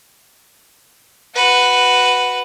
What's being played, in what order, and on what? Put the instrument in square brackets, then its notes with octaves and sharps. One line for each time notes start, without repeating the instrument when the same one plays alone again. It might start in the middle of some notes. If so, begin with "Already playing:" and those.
[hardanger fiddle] F#4 B4